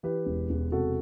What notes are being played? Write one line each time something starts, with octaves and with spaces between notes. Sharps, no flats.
E3 G4 B4
E1
E1
C3 F#4 A4